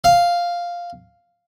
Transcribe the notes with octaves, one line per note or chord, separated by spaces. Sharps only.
F5